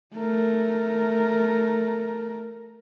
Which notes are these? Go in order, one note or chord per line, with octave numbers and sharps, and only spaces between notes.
A3 A#4